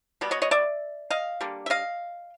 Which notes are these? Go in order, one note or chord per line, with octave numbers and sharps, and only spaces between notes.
B2 G3 B3
C#5 D#5
C#5 D#5
D5 E5
D#5 F5
D3 G3 A#3
E5
D#5 F5